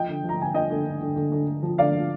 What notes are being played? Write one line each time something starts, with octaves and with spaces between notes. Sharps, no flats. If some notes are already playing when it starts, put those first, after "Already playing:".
Already playing: F3 D#5 G5
D3
F3
A#5
D3 G#5
F3 D#5 G5
D3
D3
D3
D3
D3
D3
F3
D3 D5 F5
F3